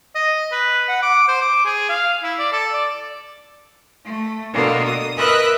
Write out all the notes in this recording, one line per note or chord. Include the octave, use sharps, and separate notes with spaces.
D#5
B4
F#5
D6
C5
D6
G#4
F5
E4
D5
A4
D5
A3
B2 D3 A#3 F4
D#6
A#4 B4 D#5 E5 B5 F#6